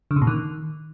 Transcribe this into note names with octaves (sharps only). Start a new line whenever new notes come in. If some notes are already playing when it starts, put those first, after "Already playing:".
D3
C#3
A#2
D#3